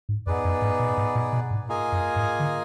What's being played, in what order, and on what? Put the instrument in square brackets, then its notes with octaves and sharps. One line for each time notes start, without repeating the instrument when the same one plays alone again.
[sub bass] G#2
[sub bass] F2 [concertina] B3 D#4 G#4 B4 D5
[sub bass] F#2
G#2
A#2
G#2
A#2
B2
G#2
[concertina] A#3 F4 G#4 D#5 G#5
[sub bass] F#2
G#2
D3